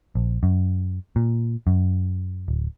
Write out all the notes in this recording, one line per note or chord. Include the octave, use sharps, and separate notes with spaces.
A#1
F#2
A#2
F#2
D1